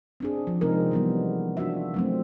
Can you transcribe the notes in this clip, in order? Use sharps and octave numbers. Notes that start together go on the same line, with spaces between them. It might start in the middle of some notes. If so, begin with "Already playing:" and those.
C4 D4 G#4
F3
C3 G#3 C4 D#4 A#4
E3 G3 B3
D4 F4 F#4 E5
F#3 A3 C4